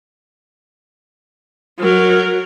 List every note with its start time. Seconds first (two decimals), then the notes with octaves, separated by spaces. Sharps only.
1.79 F#3 A#4